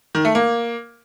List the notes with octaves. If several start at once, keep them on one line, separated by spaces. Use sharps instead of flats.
D#3
A3
A#3